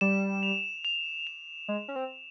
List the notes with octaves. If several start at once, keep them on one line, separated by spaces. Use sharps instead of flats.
G3 E7
F7
F7
F7
G#3
C#4
C4